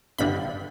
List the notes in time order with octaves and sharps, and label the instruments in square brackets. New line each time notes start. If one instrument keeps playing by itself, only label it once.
[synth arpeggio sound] G1 G2 D3 B5